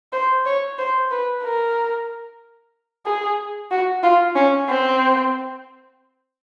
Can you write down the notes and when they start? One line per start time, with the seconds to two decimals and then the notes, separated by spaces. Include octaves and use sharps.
0.13 C5
0.46 C#5
0.79 C5
1.11 B4
1.43 A#4
3.06 G#4
3.71 F#4
4.03 F4
4.36 C#4
4.69 C4